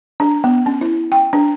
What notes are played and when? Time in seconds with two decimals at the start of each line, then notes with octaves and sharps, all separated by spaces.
0.20 D4
0.44 B3
0.66 C#4
0.81 E4
1.12 G5
1.33 D4